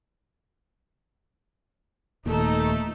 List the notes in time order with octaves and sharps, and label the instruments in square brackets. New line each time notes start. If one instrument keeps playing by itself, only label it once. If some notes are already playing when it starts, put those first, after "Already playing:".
[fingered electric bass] D#1 D#2 A#2 [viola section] A3 D#4 A4